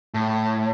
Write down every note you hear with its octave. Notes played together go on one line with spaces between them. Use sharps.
A2